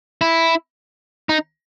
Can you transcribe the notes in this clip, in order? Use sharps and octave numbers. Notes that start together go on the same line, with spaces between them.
E4
D#4